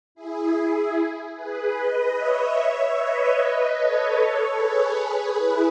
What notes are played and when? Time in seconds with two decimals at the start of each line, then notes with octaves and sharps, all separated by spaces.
0.15 E4 G#4
0.55 E4 G#4
1.36 G#4 B4
1.75 B4 D#5
2.15 C#5 E5
2.96 B4 D#5
3.75 A4 C#5
4.56 G#4 B4
5.36 E4